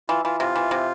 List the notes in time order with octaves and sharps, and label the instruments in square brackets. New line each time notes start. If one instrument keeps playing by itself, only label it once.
[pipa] E3 [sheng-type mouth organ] F4
[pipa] E3 [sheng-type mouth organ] F4
[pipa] C3 [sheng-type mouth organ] F4
[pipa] E3
C3